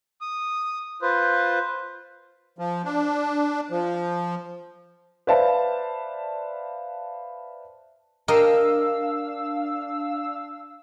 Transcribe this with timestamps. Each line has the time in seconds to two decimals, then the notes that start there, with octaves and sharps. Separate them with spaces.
0.21 D#6
1.02 F4 B4 C5
2.59 F3
2.84 D4
3.71 F3
5.27 B4 C5 D5 E5 F5 A5
8.28 D4 G4 A#4 D#5 F5 E6